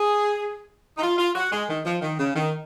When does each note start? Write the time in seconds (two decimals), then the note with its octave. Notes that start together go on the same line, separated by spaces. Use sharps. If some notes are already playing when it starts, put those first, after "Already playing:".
Already playing: G#4
0.97 D#4
1.02 F4
1.18 F4
1.35 F#4
1.51 G#3
1.68 D#3
1.85 F3
2.02 D#3
2.19 C#3
2.36 D#3